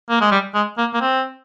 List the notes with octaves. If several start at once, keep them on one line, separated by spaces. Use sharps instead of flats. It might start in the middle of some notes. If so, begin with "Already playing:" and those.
A#3
G#3
G3
G#3
A#3
A#3
C4